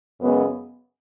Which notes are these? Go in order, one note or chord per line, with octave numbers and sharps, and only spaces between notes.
F#2 C#3 G#3 B3